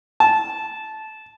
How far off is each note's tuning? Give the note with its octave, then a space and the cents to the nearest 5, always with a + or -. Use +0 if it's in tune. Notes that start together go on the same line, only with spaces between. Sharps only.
A5 -15